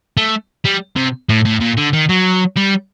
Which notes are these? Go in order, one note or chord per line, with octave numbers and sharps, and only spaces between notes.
A3
G3
C3
A2
A2
A#2
D3
D#3
F#3
G3